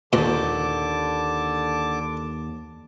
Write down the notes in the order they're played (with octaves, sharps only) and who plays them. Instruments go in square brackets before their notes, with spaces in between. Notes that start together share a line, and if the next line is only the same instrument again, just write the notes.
[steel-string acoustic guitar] D#2 [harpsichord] A#2 [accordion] D3 A5 D6